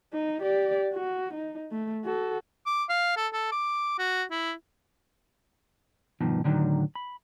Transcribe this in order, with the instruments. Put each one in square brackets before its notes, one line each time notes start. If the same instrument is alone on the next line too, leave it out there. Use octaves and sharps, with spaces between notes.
[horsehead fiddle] D#4
G4 D5
F#4
D#4
A3
F#4 A4
[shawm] D6
F5
A4
A4
D6
F#4
E4
[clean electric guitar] G2 B2 D#3 F3
A2 D3 D#3 F#3
B5